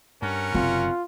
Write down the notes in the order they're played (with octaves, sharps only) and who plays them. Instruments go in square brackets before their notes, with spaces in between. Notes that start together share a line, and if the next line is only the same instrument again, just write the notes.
[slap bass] G2 [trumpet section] C#4 A#4 F#5
[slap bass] F#1 C3 [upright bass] C4 [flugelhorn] F4